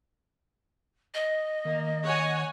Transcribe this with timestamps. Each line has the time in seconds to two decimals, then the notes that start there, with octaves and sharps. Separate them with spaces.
1.14 D#5
1.65 D#3 A#3
2.04 C#5 F#5 G#5